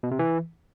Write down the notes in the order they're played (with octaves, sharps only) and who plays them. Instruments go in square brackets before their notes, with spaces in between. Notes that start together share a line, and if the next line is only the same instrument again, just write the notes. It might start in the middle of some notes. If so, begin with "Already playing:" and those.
[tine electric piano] B2
C3
E3